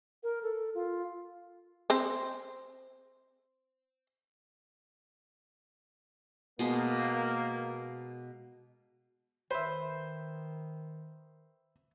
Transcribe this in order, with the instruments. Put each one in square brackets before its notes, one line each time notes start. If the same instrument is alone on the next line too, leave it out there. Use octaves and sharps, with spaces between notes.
[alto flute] A#4
A4
F4
[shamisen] C4 C5
[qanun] B2 G#3 C6 [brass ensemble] A#3
[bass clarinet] D#3 [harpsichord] B4 E5 [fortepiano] C5